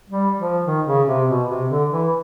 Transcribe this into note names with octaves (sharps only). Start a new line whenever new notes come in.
G3
F3
D#3
C#3
C3
B2
C3
D3
E3